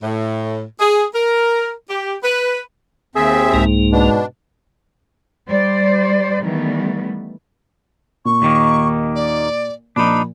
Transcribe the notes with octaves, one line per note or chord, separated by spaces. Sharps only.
A2
G#4
A#4
G4
B4
D#2 C4 G#4 E5
C2 G#2 A#3
B2 D4
G3 C5 D5
D#3 E3 G3 A3 B3
A#2 C#6
D#2 D#3 A#3
D5
A#2 F3 D4 D#4 B5